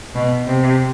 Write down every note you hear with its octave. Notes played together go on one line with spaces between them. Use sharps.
B2
C3